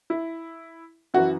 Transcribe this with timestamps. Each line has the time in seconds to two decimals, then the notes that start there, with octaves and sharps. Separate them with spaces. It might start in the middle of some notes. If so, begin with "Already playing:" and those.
0.10 E4
1.14 F#2 E3 F#4